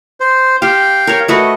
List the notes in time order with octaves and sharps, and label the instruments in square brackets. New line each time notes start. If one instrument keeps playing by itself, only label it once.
[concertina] C5
[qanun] G4 C5 [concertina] F5 G5
[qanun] A#4 C#5
[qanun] A3 F#4 B4 [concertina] D#5